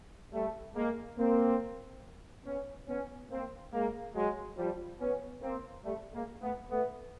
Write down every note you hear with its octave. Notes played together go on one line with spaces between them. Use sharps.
G3 A3
G#3 A#3
A#3 C4
B3 C#4
B3 C#4
A#3 C4
G#3 A#3
F#3 G#3
F3 G3
B3 C#4
A#3 C4
G3 A3
G#3 A#3
A3 B3
A3 B3